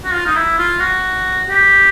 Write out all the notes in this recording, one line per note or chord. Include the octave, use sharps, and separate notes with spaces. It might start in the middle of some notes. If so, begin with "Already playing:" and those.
F#4
F4
D#4
E4
F4
F#4
G4